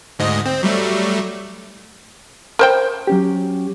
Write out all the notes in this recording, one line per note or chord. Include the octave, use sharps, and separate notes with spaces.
D2 G#2 D#5
C4
F#3 G3 A3
A#4 C5 G5
F#3 C#4 G4